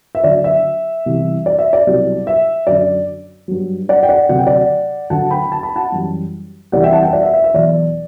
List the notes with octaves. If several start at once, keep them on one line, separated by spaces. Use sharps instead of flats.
E5
D2 D3 F#3 D5
E5
C2 C3 E3 G3
D5
E5
D5
C2 B2 F#3
E5
F#2 D3 F#3 D5
G2 F#3
D5 F#5
G5
D5 F#5
D2 C3 F#3 F#5
G5
D5 F#5
D2 D3 F#3 F#5 A5
G5 B5
A5
B5
F#5 A5
F#2 E3 G3
C2 C3 E3 G3 D5 F#5
E5 G5
F#5 A5
E5 G5
D5 F#5
E5
E5
E5
E2 B2 F#3 D5